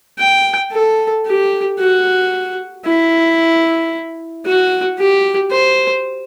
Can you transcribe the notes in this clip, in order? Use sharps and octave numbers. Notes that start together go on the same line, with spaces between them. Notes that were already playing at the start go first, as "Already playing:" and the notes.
G5
A4
G4
F#4
E4
F#4
G4
C5